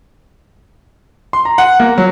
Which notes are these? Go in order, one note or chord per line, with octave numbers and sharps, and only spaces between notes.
C6
A#5
F#5
A#3
F#3